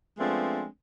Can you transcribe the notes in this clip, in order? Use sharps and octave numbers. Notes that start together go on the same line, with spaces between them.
F3 G#3 A3 B3 C4 D4